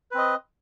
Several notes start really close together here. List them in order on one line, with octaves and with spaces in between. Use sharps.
B4 C4 D#5